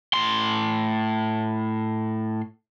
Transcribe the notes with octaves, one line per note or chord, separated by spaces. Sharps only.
A2 C6